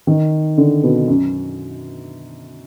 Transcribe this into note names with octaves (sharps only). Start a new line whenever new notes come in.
D#3
D3
B2
F#2